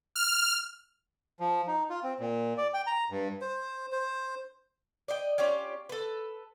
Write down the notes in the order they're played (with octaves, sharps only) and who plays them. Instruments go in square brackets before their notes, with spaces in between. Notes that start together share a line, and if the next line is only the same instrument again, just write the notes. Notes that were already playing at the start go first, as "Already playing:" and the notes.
[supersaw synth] F6
[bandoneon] F3
D#4
F4
C4
A#2
D5
G5
A#5
G2
[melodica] C5
C5
[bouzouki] D5 D#5 G5
C#4 F4 G4 D5
A4 B4